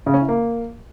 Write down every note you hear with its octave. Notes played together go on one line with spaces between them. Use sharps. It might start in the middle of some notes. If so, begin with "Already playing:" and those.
C#3
C#4
E4
A#3